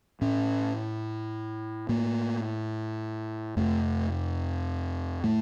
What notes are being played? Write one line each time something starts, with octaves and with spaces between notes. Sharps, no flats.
A2 C#4
A2 A#3
F2 C3 A3
A2 A3